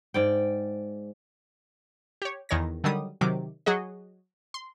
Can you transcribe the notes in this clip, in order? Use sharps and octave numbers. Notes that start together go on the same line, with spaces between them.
G#2 D5 G5
G4 C#5
E2 D#3 C#5 G#6 A#6
D3 D#3 F#3 G3 D#6
C3 D#3 F#3 D6
F#3 F#4 G#4 D#5
C6